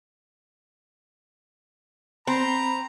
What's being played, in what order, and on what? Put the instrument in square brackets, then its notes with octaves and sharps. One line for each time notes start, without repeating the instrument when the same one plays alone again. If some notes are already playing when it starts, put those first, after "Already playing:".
[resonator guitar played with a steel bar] C4 [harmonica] A#5 B5